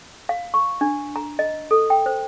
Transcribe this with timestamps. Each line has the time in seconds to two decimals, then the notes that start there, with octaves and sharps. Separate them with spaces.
0.29 F5
0.54 C#6
0.81 D4
1.16 A#5
1.39 D#5
1.71 A4
1.90 G5
2.06 C5